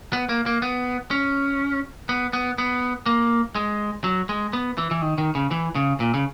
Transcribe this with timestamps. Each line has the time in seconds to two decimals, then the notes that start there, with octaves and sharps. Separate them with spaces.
0.13 B3
0.29 A#3
0.46 A#3
0.62 B3
1.11 C#4
2.09 B3
2.33 B3
2.58 B3
3.06 A#3
3.55 G#3
4.04 F#3
4.29 G#3
4.53 B3
4.78 E3
4.91 E3
5.02 D#3
5.18 D#3
5.35 C#3
5.51 E3
5.75 C#3
6.00 A#2
6.14 C#3